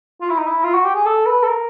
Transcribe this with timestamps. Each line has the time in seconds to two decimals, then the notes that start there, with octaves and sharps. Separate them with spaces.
0.21 F4
0.30 E4
0.38 D#4
0.47 E4
0.64 F4
0.74 F#4
0.84 G4
0.94 G#4
1.06 A4
1.26 B4
1.43 A4
1.47 A#4